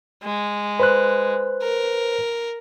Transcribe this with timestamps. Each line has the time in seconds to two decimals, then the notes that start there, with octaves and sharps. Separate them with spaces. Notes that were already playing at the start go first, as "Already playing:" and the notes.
0.23 G#3
0.80 B4 C5 F#6
1.62 A#4